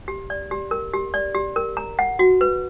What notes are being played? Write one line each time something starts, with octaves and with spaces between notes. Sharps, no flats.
G4
D5
G4
A#4
G4
D5
G4
A#4
A#5
F#5
F#4
B4